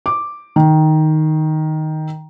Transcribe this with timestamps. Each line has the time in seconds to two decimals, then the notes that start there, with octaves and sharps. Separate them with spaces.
0.06 D6
0.56 D#3